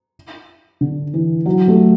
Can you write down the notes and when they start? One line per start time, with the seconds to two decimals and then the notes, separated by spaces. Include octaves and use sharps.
0.81 D3
1.14 E3
1.46 F#3
1.68 A3